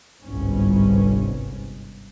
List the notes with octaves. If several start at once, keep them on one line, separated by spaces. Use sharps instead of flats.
G1 C2 G#2 C#4